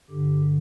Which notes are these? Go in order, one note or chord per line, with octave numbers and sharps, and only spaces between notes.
G2 D3 G4